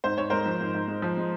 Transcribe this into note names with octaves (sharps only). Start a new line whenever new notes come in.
G#2 C5
G#2 C#5
G#3 A#4 C5
F3
G#2
G#2
G#3
F3
G#3